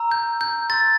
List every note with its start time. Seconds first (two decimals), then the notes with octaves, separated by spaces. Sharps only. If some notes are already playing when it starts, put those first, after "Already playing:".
Already playing: A#5 E6
0.11 G6
0.41 G6
0.70 C6 E6 G6 A6